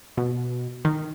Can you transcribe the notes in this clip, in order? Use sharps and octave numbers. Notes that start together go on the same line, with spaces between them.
B2
D#3